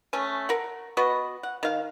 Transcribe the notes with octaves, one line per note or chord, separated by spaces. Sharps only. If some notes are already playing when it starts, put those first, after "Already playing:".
A3 C#4 G#5
A#4 F#5
B3 F#4 B4 D#5
F#5
D#3 F5